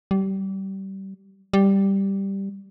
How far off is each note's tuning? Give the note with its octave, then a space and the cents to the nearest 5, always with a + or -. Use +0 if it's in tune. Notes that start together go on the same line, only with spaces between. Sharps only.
G3 -25
G3 +0